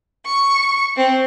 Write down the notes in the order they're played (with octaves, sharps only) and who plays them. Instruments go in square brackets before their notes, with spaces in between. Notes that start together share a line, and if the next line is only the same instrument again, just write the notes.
[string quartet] C#6
C4